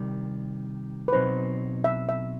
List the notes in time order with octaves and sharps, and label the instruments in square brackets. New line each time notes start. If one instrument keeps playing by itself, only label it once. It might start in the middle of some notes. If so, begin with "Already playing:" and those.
Already playing: [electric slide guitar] C3 D#3 G3
[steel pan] B4
[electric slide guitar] B2 F#3 C4 D#4 [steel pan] C5
[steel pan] E5
E5